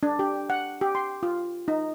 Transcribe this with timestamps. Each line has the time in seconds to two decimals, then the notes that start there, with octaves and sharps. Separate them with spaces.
0.03 D4
0.19 G4
0.50 F#5
0.81 G4
0.95 C6
1.23 F4
1.68 D#4